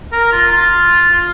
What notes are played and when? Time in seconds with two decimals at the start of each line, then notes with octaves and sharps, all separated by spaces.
0.13 A#4
0.32 F4
0.52 F4
1.12 F4